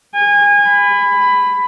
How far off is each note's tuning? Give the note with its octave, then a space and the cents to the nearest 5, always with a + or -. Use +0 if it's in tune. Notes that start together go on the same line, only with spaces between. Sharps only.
G#5 -30
B5 +15